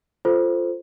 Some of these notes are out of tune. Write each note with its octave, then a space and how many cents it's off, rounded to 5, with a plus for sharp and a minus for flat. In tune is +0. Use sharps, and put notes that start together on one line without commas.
F4 +0 A4 -5 C5 -5